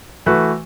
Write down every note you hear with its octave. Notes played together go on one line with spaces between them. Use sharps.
E3 A3 F#4 B4